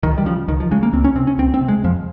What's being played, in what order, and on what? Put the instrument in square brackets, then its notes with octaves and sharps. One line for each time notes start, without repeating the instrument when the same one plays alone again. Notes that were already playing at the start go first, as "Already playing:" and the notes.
[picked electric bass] C#2 D#3
G3
C#3 F3
C#2 D#3
F3
C#3 G#3
A#3
C#2 C4
C#4
C3 C4
C#4
C#2 C4
C4
C3
G#3
F2 F3